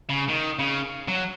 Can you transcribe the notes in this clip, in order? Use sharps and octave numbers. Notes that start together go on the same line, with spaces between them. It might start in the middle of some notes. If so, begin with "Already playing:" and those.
C#3
D#3
C#3
F#3